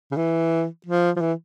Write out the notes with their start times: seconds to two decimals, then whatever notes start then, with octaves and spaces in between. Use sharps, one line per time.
0.11 C#3
0.16 E3
0.86 F3
1.16 F3
1.21 E3